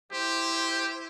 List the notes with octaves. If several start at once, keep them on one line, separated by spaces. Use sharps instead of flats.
E4 G4 C5